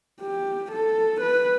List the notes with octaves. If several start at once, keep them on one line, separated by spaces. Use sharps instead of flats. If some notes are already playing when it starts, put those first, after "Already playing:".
G4
A4
B4